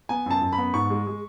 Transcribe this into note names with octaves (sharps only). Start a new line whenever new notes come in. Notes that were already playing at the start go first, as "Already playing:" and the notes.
B3 G#5
F#2 A5
F#2
B5
B3
G#2 C#6
G#3
G#3